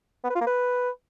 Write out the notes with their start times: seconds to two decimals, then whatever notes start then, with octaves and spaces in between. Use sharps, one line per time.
0.24 B3
0.30 B4
0.35 F4
0.41 A#3
0.47 B4